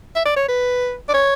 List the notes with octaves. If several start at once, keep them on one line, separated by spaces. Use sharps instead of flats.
E5
D5
C#5
B4
D5
C#5